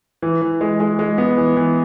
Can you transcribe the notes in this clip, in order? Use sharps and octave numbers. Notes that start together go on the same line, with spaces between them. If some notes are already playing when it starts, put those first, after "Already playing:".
E3
E3
G#3
G#3
G#3
B3
E3
E3